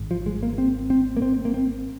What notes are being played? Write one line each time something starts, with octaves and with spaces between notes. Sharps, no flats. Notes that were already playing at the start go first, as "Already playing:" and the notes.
Already playing: G#1 G#2
F3
G#3
A#3
C4
C4
A#3
C4
A#3
C4